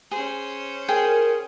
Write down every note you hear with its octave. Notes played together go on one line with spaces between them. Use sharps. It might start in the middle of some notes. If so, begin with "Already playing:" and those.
C#4 G#4 C5
G#4 A#4 G5